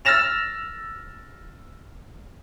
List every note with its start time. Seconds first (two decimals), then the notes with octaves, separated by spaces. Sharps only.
0.05 E6 F6 A6 A#6 E7 F7